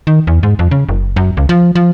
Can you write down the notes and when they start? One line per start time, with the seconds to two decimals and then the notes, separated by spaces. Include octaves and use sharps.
0.07 D#3
0.27 E2
0.43 G#2
0.59 F2
0.71 C#3
0.89 F#1
1.16 F#2
1.37 C#2
1.49 F3
1.75 F3